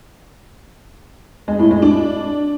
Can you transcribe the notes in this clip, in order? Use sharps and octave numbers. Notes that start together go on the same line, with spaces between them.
G#3
A2
G#3
D4